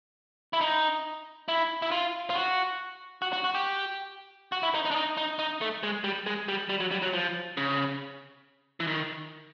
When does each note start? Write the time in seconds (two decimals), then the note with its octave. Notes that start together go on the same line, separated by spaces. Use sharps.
0.53 E4
0.61 D#4
1.48 E4
1.82 E4
1.91 F4
2.30 F4
2.35 F#4
3.22 F#4
3.33 F#4
3.44 F#4
3.55 G4
4.52 F#4
4.63 E4
4.74 D#4
4.85 D#4
4.91 D4
4.96 D#4
5.17 D#4
5.39 D#4
5.61 A3
5.83 G#3
6.04 G3
6.26 G#3
6.48 G3
6.69 G3
6.80 F#3
6.91 G3
7.02 F#3
7.13 F3
7.57 C#3
8.80 E3
8.87 D#3